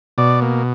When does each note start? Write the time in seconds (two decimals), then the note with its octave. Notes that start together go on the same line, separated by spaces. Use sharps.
0.18 B2 D5
0.42 A#3